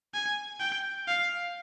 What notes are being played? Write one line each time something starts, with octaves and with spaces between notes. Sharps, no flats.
G#5
G5
F5